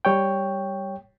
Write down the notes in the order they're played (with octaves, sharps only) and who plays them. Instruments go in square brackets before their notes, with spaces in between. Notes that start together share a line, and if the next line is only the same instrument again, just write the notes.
[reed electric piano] G3 C#5 G5